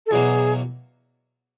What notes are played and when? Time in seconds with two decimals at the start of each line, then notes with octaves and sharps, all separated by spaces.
0.07 A4
0.11 E2 B2 F#3 A#3 G#4